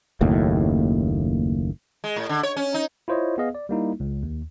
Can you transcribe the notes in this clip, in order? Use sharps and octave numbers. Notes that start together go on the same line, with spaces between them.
F#1 D#2 A2
G#3
A2
D3
C#5
C#4
D#4
E4 F4 C5 C#5 D#5
B3 G#4 D#5 F5
D5
G3 A#3 D#4 E4
C#2
D#2